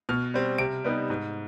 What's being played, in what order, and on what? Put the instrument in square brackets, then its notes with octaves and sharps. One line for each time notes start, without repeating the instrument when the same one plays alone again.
[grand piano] B2 F6
G3 C4
C3 D7
G3 B3 D#4
G#2